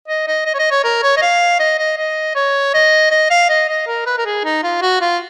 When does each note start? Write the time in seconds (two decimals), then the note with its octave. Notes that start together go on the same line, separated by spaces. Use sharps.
0.08 D#5
0.27 D#5
0.46 D#5
0.54 C#5
0.59 D#5
0.71 C#5
0.84 A#4
1.03 C#5
1.17 D#5
1.22 F5
1.60 D#5
1.79 D#5
1.98 D#5
2.35 C#5
2.74 D#5
3.11 D#5
3.31 F5
3.50 D#5
3.69 D#5
3.87 A#4
4.07 B4
4.18 A#4
4.26 G#4
4.44 D#4
4.64 F4
4.82 F#4
5.01 F4